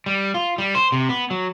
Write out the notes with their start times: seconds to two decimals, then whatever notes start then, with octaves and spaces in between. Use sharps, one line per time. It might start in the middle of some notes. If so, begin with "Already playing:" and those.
0.06 G3
0.34 F4
0.58 G3
0.75 C5
0.92 C3
1.09 B3
1.31 F#3